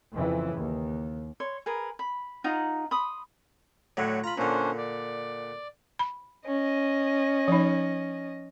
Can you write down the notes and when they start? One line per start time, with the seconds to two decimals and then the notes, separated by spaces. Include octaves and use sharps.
0.14 F2 C#3 E3
0.54 D#2
1.40 C#5 C6
1.66 G#4 A#4 B4
1.99 B5
2.44 D#4 F4 F#5 A#5
2.91 B5 C6 D#6
3.97 A2 D3 F#3
4.24 F4 A#5 B5
4.38 A#2 D3 C#4 D4 C5
4.77 D5
5.99 B5
6.47 C#4 D#5
7.48 F3 D#4